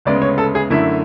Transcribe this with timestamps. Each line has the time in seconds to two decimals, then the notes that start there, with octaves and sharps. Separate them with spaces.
0.05 D2 C#3 G#3 B3 D5
0.22 C#5
0.38 A4
0.55 G#4
0.70 F#2 D3 A3 E4